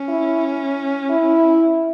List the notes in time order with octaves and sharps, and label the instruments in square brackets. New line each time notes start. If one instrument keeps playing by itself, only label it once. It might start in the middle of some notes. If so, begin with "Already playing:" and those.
Already playing: [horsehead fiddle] C#4
[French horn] E4
E4